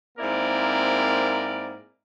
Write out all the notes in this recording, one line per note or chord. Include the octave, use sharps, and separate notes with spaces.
G#2 A#3 C4 E4 A#4 D5